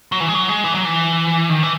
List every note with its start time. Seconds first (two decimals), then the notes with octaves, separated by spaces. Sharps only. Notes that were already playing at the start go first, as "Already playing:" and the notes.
0.12 F#3
0.20 E3
0.28 G#3
0.35 F#3
0.49 G#3
0.64 E3
0.75 F#3
0.85 E3
1.49 D#3
1.63 E3